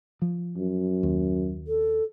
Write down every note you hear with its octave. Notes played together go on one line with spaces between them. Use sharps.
F3
F#2
D#2
A4